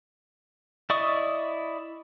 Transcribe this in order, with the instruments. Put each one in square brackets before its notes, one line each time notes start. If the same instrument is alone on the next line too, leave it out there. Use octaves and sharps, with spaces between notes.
[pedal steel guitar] E4 D5 D#5 C#6 D#6